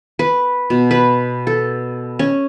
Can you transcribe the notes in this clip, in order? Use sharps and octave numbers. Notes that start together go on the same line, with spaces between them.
B4
B2
B4
A4
C#4